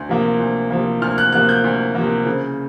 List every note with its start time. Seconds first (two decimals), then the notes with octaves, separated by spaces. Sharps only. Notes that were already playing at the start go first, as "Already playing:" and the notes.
Already playing: D2
0.09 C3 F3 A#3
0.40 D2
0.70 C3 F3 A#3
1.02 D2 F6
1.18 F#6
1.33 C3 F3 A#3 F#6
1.49 G6
1.64 D2
1.95 C3 F3 A#3
2.26 C#3